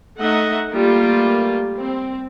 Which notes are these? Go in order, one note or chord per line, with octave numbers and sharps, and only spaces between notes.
A3 D#4 D#5 E5 F#5
G3 A3 A#3 F4
C4